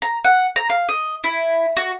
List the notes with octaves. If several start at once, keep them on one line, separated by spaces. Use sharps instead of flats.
A#5
F#5
A#5
F5
D#5
E4
F#4